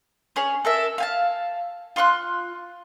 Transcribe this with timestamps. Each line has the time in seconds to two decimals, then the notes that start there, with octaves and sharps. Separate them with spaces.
0.36 C#4 G#4 C#5
0.65 A4 A#4 E5
0.98 F5 G#5 A5
1.96 F4 C6 C#6 F#6